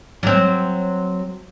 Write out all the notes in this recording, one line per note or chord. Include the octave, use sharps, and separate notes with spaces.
F#3 C4